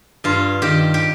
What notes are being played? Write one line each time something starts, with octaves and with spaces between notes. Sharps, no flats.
G2 F4
D#3 G4
G4